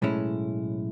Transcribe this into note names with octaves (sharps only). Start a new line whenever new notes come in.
B1 A2 G#3 C#4 E4